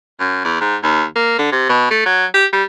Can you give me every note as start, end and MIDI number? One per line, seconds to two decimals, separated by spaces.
0.20 0.41 42
0.45 0.60 40
0.61 0.76 44
0.83 1.04 39
1.16 1.37 58
1.39 1.52 50
1.52 1.66 48
1.69 1.87 47
1.90 2.03 57
2.06 2.26 54
2.34 2.46 67
2.53 2.64 55